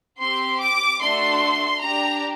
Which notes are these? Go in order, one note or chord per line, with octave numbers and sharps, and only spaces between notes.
C4 G4 C6
D6
A3 D4 F#4 A4 C6
D4 G4 A#5